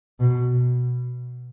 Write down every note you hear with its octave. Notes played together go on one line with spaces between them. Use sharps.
B2